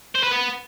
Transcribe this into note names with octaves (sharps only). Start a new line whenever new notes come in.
C5
B4
B3